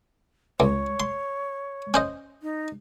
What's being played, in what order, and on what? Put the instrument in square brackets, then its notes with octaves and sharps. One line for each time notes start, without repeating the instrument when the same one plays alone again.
[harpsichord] C#2 [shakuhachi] C#5
[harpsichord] C6
C#4 C5 D#5
[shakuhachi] D#4